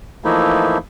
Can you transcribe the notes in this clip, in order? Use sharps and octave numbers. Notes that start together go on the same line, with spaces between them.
E3 F3 A3 A#3 D#4 E4